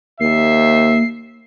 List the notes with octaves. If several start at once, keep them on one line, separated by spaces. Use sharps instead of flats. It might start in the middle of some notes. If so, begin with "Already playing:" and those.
D#2 A#3 E5 C7